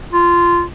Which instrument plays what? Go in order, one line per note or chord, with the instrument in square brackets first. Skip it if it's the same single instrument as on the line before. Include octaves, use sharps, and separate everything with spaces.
[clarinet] F4